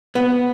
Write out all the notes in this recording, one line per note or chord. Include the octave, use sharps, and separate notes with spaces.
B3